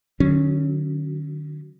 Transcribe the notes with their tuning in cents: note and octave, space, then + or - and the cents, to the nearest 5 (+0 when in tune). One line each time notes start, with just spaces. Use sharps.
D3 +45 F#3 +0 C#4 +0